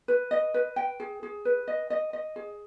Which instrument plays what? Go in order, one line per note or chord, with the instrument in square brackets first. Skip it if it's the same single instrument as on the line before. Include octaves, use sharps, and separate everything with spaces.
[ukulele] B4
D#5
B4
G5
G#4
G#4
B4
D#5
D#5
D#5
G#4